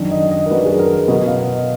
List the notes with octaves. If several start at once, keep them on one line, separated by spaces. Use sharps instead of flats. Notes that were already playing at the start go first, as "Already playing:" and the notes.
Already playing: F#2 D#3 F#3 D4
D#5
D#5
A#4
F#2 D#3 F#3 D4 B4
G#4
A#4
B4
B2 F#3 B3 D#5
F5
D#5